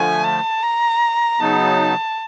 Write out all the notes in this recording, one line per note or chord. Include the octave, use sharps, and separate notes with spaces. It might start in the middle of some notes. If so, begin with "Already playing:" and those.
Already playing: D3 F3 A3 G#5
A5
A#5
C#3 F#3 B3 D#4 A5